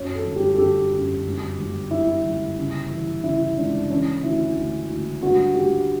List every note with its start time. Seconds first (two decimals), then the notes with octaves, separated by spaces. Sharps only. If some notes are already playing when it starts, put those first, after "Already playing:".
Already playing: F#2 C#5
0.15 A4
0.25 G1
0.36 G4
0.55 A4
0.58 D3 G4
0.92 F#2
1.26 G1
1.58 G1
1.91 D3 E4
2.25 G1
2.57 C#3
2.91 E3
3.24 C#3 E4
3.57 C#2 D4
3.90 E3 C#4
4.24 D2 E4
4.56 D2
4.90 D2
5.23 G2 F#4
5.56 G2 G4